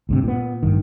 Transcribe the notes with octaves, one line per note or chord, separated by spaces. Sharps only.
D2 G2 C3
A#2 B3
A1 G2 D#3